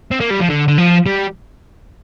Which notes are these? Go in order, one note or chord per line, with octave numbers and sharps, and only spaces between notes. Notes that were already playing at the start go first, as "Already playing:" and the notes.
C4
A#3
G3
F3
D3
D3
F3
G3